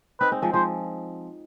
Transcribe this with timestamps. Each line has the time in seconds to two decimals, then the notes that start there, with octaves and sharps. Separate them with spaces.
0.20 C4 D#4 B4
0.31 G#3 C4
0.42 F3 G#3
0.53 F3 G#3 C5